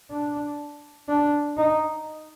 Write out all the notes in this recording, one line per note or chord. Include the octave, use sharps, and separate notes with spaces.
D4
D4
D#4